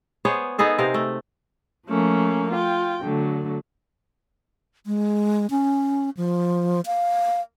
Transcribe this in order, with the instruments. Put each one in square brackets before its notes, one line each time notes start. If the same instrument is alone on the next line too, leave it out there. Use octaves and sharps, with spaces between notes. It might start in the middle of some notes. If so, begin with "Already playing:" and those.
[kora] B3 G#4 C5 C#5
B3 D#4 G#4 A4
C3 A#4 C5 F5
A3
[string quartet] F3 A3 A#3 C#4
F4 G5
D3 F#3 A3
[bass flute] G#3
C#4
F3
F5